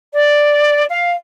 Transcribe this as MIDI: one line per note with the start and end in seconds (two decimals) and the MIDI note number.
0.13 0.84 74
0.89 1.12 77